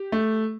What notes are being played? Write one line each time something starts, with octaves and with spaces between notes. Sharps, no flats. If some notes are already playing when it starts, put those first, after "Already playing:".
Already playing: G4
A3